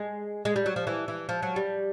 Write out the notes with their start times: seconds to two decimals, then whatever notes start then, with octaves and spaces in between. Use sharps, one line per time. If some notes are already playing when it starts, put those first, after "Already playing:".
Already playing: G#3
0.45 G#3
0.56 G3
0.66 F#3
0.76 F3
0.87 E3
1.08 E3
1.29 F3
1.42 F#3
1.56 G3